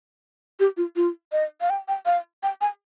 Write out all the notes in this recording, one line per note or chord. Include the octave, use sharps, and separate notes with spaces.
G4
F4
F4
D#5
F5
G5
G5
F5
G5
G#5